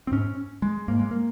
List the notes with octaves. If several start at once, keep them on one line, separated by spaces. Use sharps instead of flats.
C4
G#2 C#4
G#3
G#2 A#3
G#3
A#3